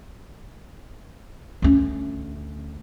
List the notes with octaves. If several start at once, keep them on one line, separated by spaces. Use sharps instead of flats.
D2 C#4